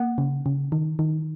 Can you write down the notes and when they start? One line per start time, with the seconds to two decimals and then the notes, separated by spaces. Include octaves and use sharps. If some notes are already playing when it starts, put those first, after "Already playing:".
Already playing: A#3 F#5
0.18 C#3
0.46 C#3
0.72 D#3
0.99 D#3